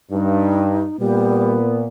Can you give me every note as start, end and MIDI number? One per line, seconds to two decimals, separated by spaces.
0.11 0.85 43
0.11 0.97 63
1.00 1.88 46
1.00 1.58 55
1.00 1.88 59